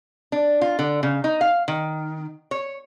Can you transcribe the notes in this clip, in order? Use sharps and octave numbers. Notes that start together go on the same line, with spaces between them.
D4
F4
D3
C#3
D#4
F5
D#3
C#5